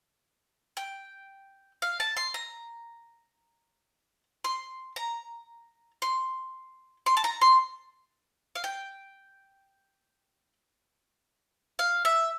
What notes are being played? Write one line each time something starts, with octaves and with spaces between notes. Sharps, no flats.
G5
F5
A5
C6
A#5
C6
A#5
C6
C6
A5
A#5
C6
F5
G5
F5
E5